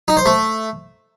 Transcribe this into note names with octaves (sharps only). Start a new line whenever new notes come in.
D#4
C5
A3